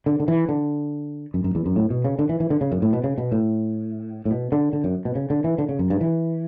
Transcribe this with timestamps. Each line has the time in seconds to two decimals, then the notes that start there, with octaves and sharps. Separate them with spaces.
0.06 D3
0.20 D3
0.28 E3
0.49 D3
1.34 F#2
1.44 F#2
1.55 E2
1.66 F#2
1.76 A2
1.90 B2
2.04 C#3
2.19 D3
2.29 E3
2.40 E3
2.50 D3
2.61 C#3
2.72 F#2
2.82 A2
2.93 B2
3.04 C#3
3.18 B2
3.32 A2
4.25 A2
4.31 B2
4.52 D3
4.73 D3
4.84 F#2
5.05 B2
5.15 C#3
5.30 D3
5.44 E3
5.58 D3
5.69 C#3
5.79 F#2
5.90 G2
6.01 E3